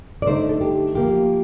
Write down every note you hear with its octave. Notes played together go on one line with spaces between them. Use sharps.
D5
D3 A3 D#4 C5
A4
G4
F3 A#3 F4 G4